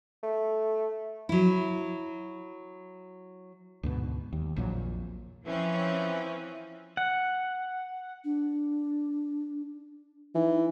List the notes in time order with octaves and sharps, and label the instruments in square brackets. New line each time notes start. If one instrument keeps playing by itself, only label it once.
[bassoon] A3
[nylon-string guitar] F#3 E4
[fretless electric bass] D2 G#2 B2
D#2
A#1 F2 A#2 F#3
[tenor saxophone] E3 [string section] F3 C4 C#4
[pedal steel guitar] F#5
[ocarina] D4
[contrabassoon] E3 [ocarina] D#4